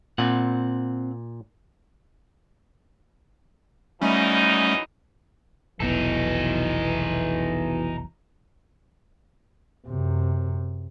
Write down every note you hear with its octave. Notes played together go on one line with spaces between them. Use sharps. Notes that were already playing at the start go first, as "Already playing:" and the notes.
A#2 C4 F#5
F#2 E3 G3 A3 C#4 D#4
F1 B1 E2 B2 E3 B3 D#4 A4
F#2 C3